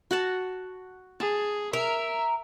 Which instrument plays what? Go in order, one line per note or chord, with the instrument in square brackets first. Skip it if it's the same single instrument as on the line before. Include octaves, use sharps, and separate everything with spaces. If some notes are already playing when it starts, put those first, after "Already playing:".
[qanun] F#4 F#5 A5
[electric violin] G#4 [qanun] A5
[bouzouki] A#4 [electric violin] E5